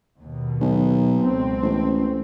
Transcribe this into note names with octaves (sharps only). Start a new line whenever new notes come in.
D#2 B2
B1
C#2 C4
A1